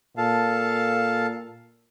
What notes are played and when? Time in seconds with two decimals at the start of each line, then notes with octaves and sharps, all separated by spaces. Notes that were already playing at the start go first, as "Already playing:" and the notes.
0.17 A#2 A4 F5 A5